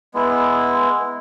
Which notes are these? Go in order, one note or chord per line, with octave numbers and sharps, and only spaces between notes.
G#3 B3 E4